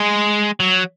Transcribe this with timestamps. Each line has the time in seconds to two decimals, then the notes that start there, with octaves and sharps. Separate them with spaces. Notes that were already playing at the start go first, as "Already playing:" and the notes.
Already playing: G#3
0.60 F#3